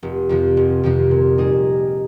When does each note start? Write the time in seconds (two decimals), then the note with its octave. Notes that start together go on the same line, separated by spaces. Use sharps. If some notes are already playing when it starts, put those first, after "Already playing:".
0.03 F1
0.29 F2 C3 F3
0.57 F1
0.83 F2 C3 F3
1.11 A#2
1.38 G3 A#3 D#4 G#4